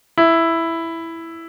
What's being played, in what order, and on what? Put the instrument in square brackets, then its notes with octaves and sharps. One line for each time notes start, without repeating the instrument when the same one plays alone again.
[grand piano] E4